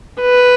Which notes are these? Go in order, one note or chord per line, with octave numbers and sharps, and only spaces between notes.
B4